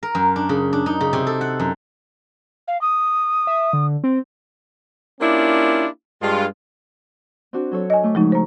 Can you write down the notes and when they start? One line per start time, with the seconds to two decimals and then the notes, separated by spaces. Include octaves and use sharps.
0.03 A#4
0.15 F#2
0.36 D4
0.49 C#3
0.73 D4
0.86 D#4
1.01 C#3
1.13 C3
1.27 A4
1.41 F#5
1.60 F#2
2.68 F5
2.81 D#6
3.47 E5
3.73 D3
4.04 C4
5.21 A#3 C#4 D4 E4 F4 G4
6.22 G2 G#3 F4
7.53 C4 D4 F#4
7.71 F#3 A4 C#5
7.90 D#5 G#5
8.04 A3 D4 C#6
8.15 C#3 F3 G#3 D#4
8.32 C5 A#5